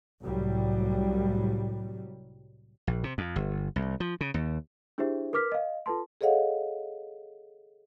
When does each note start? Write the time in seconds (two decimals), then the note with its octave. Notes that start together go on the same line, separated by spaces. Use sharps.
0.23 C2 A2 F#3 G3
2.87 A#1
3.04 C3
3.18 F2
3.36 G1
3.76 C2
4.00 F3
4.21 C#3
4.34 D#2
4.98 D4 E4 G4 G#4 C5 E5
5.33 A#4 B4 D6 F6 B6
5.52 D#5 F5
5.86 F4 A4 B4 A5 C6
6.21 G#4 A4 C#5 D#5 F5 F#5